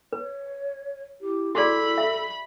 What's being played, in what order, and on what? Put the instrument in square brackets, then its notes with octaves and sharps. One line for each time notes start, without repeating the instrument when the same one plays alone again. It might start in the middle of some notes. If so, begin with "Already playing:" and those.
[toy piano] B4 [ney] C#5
[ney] E4 [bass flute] G4
[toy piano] F#4 G#4 D5 [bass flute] A4 [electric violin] B5
[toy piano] E5